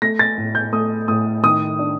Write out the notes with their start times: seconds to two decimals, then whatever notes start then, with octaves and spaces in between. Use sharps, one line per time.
0.02 A3 A#6
0.19 A6
0.38 A2
0.55 G6
0.73 A3 D#6
1.08 A2 D#6
1.43 D#3 D#6
1.79 D4